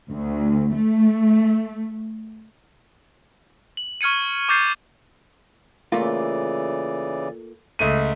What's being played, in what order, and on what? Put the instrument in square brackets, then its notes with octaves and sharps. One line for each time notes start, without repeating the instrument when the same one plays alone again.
[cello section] D2
A3
[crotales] F#7
C#6 F6 G#6 C#7 D#7
C#6 D6 G6 A6 C7
[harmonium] C#3 E3 D5 [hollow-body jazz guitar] A3 A#3 F4
[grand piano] C#2 A3 D#7